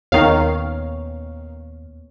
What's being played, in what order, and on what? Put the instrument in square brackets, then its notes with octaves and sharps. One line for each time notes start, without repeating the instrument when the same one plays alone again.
[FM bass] D#2 [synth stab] D#3 F5 [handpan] A#3 B3 C#5